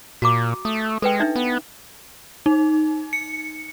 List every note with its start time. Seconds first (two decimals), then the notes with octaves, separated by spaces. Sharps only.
0.22 A#2 F#4 A#5 D6
0.65 A3 D#6
1.02 G#3 A4 B4 G5
1.20 D4 D#4 E5
1.36 B3
2.46 D#4
3.13 C#7